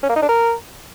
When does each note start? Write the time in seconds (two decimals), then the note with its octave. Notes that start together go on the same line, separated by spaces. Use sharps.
0.03 C#4
0.09 A#3
0.16 D#4
0.22 D4
0.29 A#4